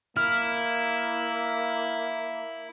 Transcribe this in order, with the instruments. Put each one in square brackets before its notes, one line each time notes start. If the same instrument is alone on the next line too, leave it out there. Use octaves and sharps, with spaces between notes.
[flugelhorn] A#3 [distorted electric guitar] E4 [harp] F6